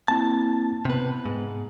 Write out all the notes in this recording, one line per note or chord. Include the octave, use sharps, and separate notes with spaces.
A#3 C4 E4 A5
C3 B3 B4
G#2